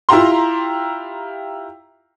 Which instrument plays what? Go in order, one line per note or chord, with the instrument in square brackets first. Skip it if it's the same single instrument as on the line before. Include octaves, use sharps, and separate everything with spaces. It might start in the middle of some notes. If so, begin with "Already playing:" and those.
[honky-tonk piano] E4 F4 G4 A#5 C6